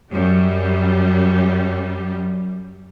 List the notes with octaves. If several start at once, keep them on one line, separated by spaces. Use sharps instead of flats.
F#2 G3